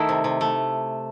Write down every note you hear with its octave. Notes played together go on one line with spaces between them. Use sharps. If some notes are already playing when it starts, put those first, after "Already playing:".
Already playing: D#3 A3 E4
C3
C3
A3